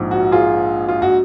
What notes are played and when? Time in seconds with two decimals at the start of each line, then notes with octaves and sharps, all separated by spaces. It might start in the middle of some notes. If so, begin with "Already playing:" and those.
Already playing: A#1 G#2 F3
0.11 F#4
0.32 F4 G#4
0.88 F4
1.02 F#4